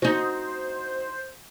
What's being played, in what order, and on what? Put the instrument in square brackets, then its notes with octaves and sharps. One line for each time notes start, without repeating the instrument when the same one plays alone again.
[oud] D#4 F#4 [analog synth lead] C5